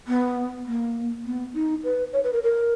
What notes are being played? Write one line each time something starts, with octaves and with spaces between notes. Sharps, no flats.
B3
A#3
B3
D#4
B4
C#5
B4
A#4
A#4